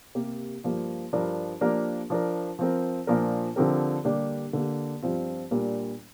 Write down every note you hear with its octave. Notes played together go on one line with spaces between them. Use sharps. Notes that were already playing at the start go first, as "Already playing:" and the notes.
C3 A#3 G4 A#4
G2 F3 A#3
G2 F3 D4 A#4
F3 A#3 D4 G4 A#4
F3 D4 A#4
F3 C4 A#4
A#2 F3 D4 A#4
D3 F3 C4 G4 A#4
D3 G3 A#3 D4 G4
D3 A#3 G4
G2 F3 C4 F4
A#2 G3 D4 A#4